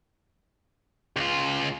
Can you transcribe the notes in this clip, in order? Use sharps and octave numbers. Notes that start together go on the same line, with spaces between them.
C#2 F4